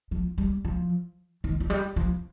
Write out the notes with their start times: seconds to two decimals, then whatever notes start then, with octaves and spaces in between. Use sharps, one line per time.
0.11 F3
0.38 G3
0.65 F3
1.44 D#3
1.60 F3
1.70 G3
1.96 F3